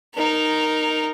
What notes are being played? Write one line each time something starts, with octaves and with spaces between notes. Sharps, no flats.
D#4 A#4